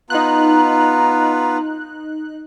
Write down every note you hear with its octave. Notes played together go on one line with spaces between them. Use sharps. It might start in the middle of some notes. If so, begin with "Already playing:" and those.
B3 D#4 F4 A#5 F#6